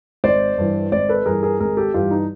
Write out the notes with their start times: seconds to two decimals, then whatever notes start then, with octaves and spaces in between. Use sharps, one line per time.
0.24 G#1 C5 D5
0.58 G2 E3
0.92 G#1 C5 D5
1.09 A4 B4
1.26 G2 E3 G#4 A#4
1.43 G#4 A#4
1.60 G#1 G#4 A#4
1.77 G4 A4
1.94 G2 E3 F4 G4
2.11 D#4